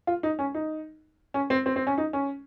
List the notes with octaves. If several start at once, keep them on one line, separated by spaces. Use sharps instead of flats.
F4
D#4
C#4
D#4
C#4
C4
C4
C4
C#4
D#4
C#4